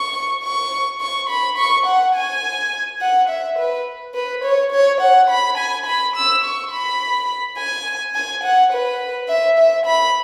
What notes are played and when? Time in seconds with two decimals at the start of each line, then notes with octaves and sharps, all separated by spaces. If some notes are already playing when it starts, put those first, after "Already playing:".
Already playing: C#6
0.43 C#6
1.01 C#6
1.30 B5
1.57 C#6
1.86 F#5
2.15 G#5
3.01 F#5
3.29 E5
3.59 B4
4.15 B4
4.44 C#5
4.72 C#5
5.01 F#5
5.30 B5
5.58 G#5
5.86 B5
6.16 E6
6.44 C#6
6.72 B5
7.58 G#5
8.15 G#5
8.44 F#5
8.73 B4
9.29 E5
9.58 E5
9.86 B5